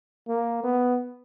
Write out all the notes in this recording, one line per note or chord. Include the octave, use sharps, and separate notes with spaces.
A#3
B3